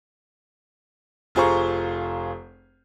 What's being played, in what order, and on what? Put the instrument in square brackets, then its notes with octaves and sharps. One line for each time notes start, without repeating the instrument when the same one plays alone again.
[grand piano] F1 F4 G#4 C5 A#5 C#6